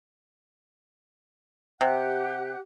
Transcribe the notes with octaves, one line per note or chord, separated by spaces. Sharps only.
C3 G4 F#5 F#6